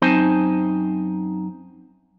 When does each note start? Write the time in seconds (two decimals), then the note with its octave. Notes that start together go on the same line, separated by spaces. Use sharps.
0.02 F#2 C4 D#4 C5 G#5 A5